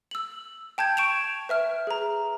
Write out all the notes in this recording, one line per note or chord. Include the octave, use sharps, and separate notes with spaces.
E6 F#7
G5 A5 G6 G#6
C#6 D7 E7 F7
B4 E5 F6
G#4 A#5